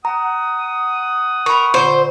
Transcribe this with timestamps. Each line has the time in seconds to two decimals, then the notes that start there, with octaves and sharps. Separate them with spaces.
0.05 F#5 A#5 D#6
1.46 A#4 B5 C#6
1.74 A#2 D3 C5